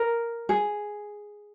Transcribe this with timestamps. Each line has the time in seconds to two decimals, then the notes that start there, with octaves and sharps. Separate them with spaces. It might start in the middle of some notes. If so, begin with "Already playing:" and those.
Already playing: A#4
0.49 G#4